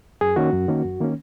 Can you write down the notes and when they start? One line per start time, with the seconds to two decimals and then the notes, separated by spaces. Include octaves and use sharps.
0.21 F#2 G#4
0.36 D#3 A#3 C#4 F#4
0.53 F#2
0.68 D#3 A#3 C#4
0.84 F#2
1.01 D#3 A#3 C#4